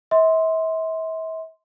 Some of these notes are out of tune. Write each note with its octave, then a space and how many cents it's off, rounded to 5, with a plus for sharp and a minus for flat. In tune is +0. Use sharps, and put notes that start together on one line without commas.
E5 -40 C6 -5